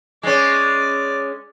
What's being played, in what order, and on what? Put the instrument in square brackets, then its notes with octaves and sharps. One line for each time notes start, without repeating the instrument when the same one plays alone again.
[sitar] G#3 C#4 [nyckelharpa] D5